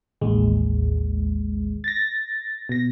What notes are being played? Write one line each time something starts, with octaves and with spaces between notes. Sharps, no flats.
A1 D#2 G#3
A6 A#6
B2 A#6